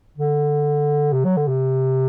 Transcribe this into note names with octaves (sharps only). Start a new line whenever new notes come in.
D3
C3
F#3
D3
C3